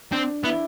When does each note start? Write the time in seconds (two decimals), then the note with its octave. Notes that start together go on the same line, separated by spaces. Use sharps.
0.12 C4 D4
0.44 B3 E4